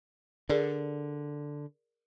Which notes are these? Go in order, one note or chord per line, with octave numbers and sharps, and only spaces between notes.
D3 G#4 A#4 D5